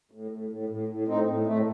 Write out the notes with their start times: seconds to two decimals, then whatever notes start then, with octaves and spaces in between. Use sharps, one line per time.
0.11 A2
0.31 A2
0.50 A2
0.69 A2
0.88 A2
1.07 A2 C4 D#4
1.27 A2
1.46 A2 A3